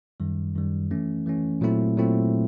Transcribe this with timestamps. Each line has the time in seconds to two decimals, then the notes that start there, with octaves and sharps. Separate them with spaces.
0.20 F#2 D#3 G3
0.55 F#2 D#3 G3
0.91 E3 A3 C#4
1.26 E3 A3 C#4
1.61 A#2 F#3 A3 C4 E4
1.97 A#2 F#3 A3 C4 E4